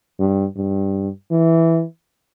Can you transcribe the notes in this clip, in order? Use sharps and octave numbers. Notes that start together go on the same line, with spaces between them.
G2
G2
E3